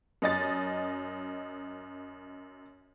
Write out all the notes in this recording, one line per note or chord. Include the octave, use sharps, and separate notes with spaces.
F#2 D#5 A6